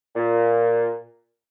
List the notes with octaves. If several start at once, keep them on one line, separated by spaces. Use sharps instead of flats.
A#2